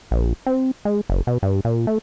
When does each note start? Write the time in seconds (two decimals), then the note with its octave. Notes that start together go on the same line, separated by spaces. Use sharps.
0.11 A#1
0.46 C4
0.85 G#3
1.10 F#1
1.27 B2
1.43 G2
1.65 A#2
1.87 A3